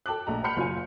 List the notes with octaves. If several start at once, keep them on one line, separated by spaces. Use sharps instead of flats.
A4 G5 A5 D6 F#6
A#1 A3 D#5 A#5
F#5 G5 B5 F6 G6 C#7
F#1 F4 G#5